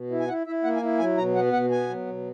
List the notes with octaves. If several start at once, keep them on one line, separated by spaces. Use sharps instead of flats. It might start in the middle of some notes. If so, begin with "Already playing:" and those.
Already playing: B2
E4
G#5
E4 F#5
E4 E5
A#3 F#5
G#5
E4
F#3 G#5
B2 A#5
B3 F#5
B2 F#5
B3 G#5
F#3
B2